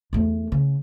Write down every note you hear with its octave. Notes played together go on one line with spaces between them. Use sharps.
E2 A3
C#3